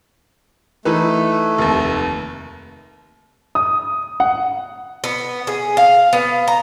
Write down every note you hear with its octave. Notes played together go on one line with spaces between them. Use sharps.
E3 A3 D#4 B4
F1 D#2
D#6
F#5
B3
G#4
F5
B3
A#5